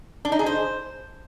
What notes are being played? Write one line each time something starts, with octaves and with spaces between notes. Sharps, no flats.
D4
D#4
G#4
C5